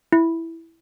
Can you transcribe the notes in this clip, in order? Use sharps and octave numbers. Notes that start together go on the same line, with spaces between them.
E4